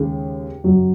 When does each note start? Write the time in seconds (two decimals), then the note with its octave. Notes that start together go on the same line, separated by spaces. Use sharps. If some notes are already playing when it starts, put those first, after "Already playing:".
Already playing: D#2 C#3 G#3
0.64 F#2 C#3 F#3